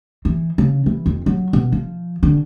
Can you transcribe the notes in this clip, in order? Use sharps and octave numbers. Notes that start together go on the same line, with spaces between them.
E3
C#3
E3
F2
F#3
B2
F3
D3